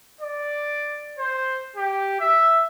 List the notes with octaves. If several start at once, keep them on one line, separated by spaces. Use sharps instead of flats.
D5
C5
G4
E5